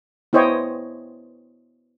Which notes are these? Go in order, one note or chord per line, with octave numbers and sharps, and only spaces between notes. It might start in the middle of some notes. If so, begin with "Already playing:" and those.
B3 E4 C5 C#5 D#5 G5